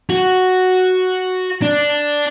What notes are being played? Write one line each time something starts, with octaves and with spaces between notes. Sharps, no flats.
F#4
D4